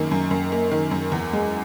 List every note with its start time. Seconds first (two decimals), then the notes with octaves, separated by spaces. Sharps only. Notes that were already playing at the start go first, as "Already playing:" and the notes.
Already playing: F#2 D#3 A#3
0.11 F#2
0.31 F#2
0.52 A#3
0.71 D#3
0.91 F#2
1.12 E2
1.33 G#3